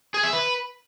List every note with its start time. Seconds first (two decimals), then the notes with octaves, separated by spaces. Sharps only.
0.14 G#4
0.24 E5
0.33 B4